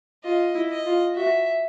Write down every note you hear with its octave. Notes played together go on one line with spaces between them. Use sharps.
F4 D#5
E4
D#5
F4
F#4 E5